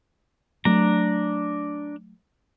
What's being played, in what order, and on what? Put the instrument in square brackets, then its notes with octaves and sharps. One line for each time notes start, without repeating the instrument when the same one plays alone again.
[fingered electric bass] F#3 A3 [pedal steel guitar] D4 A#5